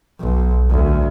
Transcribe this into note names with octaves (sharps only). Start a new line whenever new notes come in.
B1
D2